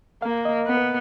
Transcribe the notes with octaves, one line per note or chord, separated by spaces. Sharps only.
A#3 F5
D#5
B3
B4